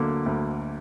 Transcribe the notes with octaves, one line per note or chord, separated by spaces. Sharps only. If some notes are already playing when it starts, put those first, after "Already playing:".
Already playing: D2 D3 F#3 A#3 D6
D2